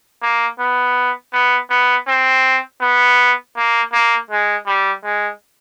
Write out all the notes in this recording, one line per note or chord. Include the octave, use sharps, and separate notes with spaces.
A#3
B3
B3
B3
C4
B3
A#3
A#3
G#3
G3
G#3